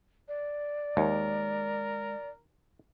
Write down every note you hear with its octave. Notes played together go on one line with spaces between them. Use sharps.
D5
D#2 G#3 A#4